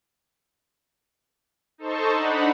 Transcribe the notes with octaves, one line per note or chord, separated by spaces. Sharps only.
D#4 A4 C5 A5 C#6
D4 D#4 F#5 B5